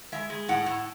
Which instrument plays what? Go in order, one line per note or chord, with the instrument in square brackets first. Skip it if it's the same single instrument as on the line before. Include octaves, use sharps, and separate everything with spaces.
[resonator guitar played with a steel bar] G#3 E5
G#3
A2 F#5
A2